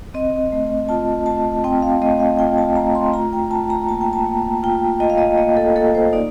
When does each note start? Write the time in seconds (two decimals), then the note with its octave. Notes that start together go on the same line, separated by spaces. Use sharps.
0.14 C4 D#5
0.52 A3
0.89 F4 A5
1.26 A3 A5
1.64 C4 G5
1.82 F5
2.02 A3 D#5
2.20 F5
2.39 F4 G5
2.58 A5
2.76 A3 A#5
2.95 C6
3.13 F4 A#5
3.33 G5
3.51 F4 A5
3.70 A#5
3.88 A#3 A5
4.01 G5
4.13 A5
4.26 A#3
4.63 F4 G5
5.00 F4 D#5
5.10 F5
5.18 D#5
5.38 A#3 D#5
5.57 A4
5.76 A#3 A4
5.95 C5
6.13 D#4 D5